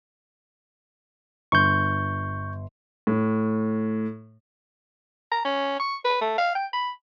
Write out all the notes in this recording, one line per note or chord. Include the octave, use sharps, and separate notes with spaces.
G1 C6 C#6 G6
A2
A#5
C#4
C#6
B4
A3
F5
G5
B5